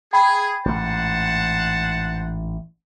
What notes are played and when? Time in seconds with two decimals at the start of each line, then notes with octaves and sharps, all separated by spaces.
0.13 G#4 G5 B5
0.66 A1 G#2 C5 F#5 A5